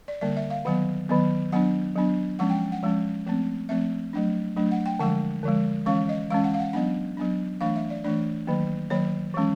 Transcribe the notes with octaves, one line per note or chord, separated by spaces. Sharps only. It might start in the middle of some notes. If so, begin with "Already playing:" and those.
D5
D3 G3 A#3 D5
E5
F5
D#3 F#3 B3 F#5
D#3 F#3 B3
F#3 B3 D4 F#5
F#3 B3 D4
F3 G#3 C#4 F#5
G5
F#5
F3 G#3 C#4
F3 A3 C4
F3 A3 C4 E5
F#3 A3 D4
F#3 A3 D4
F#5
G5
D3 F3 G#3 F#5
D3 F3 G#3
E3 G#3 C#4 F5
D#5
E3 G#3 C#4 F5
F#5
F5
F#5
F#3 B3 D4 F#5
F#3 B3 D4
E3 A3 D4 F5
E5
D5
E3 A3 D4 D5
D#3 F#3 A#3
D#3 F#3 A#3 C#5
E3 G#3 C#4